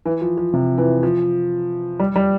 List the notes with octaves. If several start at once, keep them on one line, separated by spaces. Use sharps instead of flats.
E3
F3
F3
C3
E3
F3
G3
G3